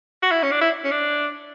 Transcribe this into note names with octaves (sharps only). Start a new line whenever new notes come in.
F#4
E4
C#4
D4
E4
C#4
D4